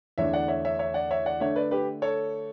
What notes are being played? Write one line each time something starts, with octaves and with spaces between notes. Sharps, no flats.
E2 D3 A3 D4 C#5 E5
D5 F#5
C#5 E5
C#5 E5
C#5 E5
D5 F#5
C#5 E5
D5 F#5
D3 A3 D4 C#5 E5
B4 D5
G4 B4
A4 C#5